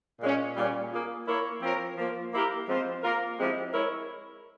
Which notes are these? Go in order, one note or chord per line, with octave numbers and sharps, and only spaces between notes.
A#2 G#3 C#4
A#2 G3 A#3 C#4
A#3 F4 G#4
A#3 E4 A#4 C#5
F3 C4 F4 A#4 C#5
F3 A#3 F4
A#3 E4 G4 A#4
F3 G#3 C4 F4 C5
A#3 F4 A#4
F3 G#3 C4 E4 G4
G#3 E4 A#4 C#5